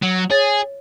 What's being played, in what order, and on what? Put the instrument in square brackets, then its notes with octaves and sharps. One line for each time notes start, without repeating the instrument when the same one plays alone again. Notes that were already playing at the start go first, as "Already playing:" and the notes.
[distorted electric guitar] F#3
[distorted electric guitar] G#4 [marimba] C#5 A6